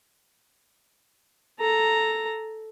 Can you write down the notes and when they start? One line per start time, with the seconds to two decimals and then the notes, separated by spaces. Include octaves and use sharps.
1.59 A4 A#5